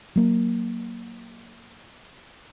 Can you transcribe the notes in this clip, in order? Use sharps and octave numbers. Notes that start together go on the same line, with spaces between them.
F#3 A#3